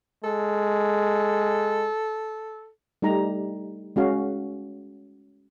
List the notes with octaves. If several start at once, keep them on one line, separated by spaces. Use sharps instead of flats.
G#3 A4
G3 A3 D#4 G4 A#5
G#3 C#4 F#4 F5